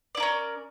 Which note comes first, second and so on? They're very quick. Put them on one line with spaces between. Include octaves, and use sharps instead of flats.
D5 E4 A#4 C#4